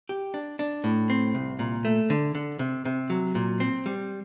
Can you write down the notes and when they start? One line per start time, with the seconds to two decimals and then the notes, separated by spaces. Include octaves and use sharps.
0.09 G4
0.34 D4
0.59 D4
0.84 A2
1.10 C4
1.35 C2
1.59 A#2
1.85 A3
2.10 D3
2.35 D3
2.59 C3
2.85 C3
3.10 F#3
3.35 A#2
3.60 C4
3.86 G3